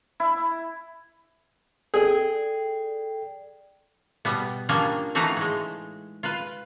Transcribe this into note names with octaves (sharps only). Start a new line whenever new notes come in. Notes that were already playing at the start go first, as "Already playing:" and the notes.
E4
G#4 A4 D5 G5
B2 G3 B3
F3 G3 A#3 C#4 D4 F4
E3 A3 D#4 F#4 F5 A#5
A2 G#3
F4 B4